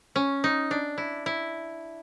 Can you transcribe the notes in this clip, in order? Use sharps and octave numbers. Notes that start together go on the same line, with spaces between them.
C#4
D#4
D4
E4
E4